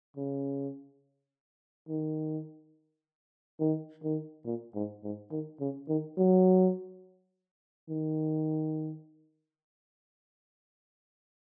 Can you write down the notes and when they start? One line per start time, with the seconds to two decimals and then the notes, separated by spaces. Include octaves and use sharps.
0.17 C#3
1.88 D#3
3.60 D#3
4.03 D#3
4.45 A#2
4.75 G#2
5.03 G#2
5.31 D#3
5.60 C#3
5.89 D#3
6.18 F#3
7.89 D#3